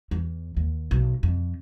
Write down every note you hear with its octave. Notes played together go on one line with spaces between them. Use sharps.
E2
D#2
B1
F2